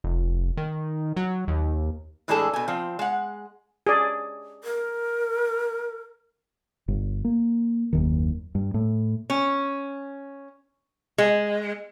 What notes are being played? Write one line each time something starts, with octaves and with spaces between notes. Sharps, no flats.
F1
D#3
F#3
D#2
A2 E3 G#3 D4 G#4 A4
B2 G#5
F3 C4
G#3 F#5
G#4 D5
A#4
G1
A#3
F#1 D#2 D#3
G2
A2
C#4
G#3